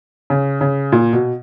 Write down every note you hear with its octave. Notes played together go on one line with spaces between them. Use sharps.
C#3
C#3
A#2
B2